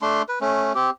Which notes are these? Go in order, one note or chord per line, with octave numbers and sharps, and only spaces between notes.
A3 D4 C6
B4
A3 C#4
C4 G4